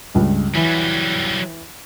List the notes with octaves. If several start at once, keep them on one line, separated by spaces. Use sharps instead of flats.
C#2 G2
E3 F#3 G3